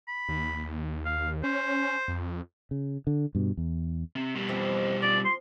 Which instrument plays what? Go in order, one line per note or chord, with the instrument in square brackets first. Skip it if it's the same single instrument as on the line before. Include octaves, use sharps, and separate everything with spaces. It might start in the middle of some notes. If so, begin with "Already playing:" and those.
[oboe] B5
[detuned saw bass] D#2
[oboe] F5
[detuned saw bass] C#4 [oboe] C5
[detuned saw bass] F2
[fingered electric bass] C#3
D3
G2 B2
E2
[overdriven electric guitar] C3
B2 G3
[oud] F2 E3 C4
[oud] F3 [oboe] D5
[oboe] C6